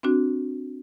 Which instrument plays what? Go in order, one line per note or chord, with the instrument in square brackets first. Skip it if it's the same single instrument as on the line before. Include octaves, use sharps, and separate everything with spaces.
[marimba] C4 D4 F#4